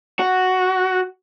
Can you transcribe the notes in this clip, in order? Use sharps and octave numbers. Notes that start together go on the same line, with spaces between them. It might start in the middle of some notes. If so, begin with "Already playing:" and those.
F#4